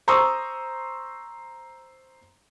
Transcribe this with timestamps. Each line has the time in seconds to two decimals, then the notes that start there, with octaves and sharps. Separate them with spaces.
0.08 C5 A#5 C6 C#6 D#6 E6